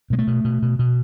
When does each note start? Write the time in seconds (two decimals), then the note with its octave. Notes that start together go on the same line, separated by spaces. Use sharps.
0.10 B2 G#3
0.19 A3
0.27 B2
0.45 B2
0.62 B2
0.79 B2